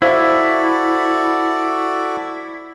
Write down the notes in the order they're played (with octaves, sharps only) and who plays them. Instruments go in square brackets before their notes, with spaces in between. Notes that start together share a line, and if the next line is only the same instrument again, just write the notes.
[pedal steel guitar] E4 [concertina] F#4 A4 D5 [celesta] C5 F5 E6